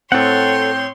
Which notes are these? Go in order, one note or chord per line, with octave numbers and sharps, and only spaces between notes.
A2 C4 A4 C#5 F#5 G5 C6